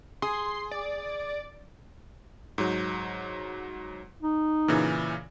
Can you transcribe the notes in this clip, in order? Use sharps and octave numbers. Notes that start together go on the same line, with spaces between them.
G#4 C6
D5
G#2 F#3
D#4
A#2 C#3 E3